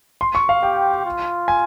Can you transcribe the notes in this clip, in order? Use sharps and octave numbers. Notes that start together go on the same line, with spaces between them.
C6
C#6
F5
G4 G5
F4
G#5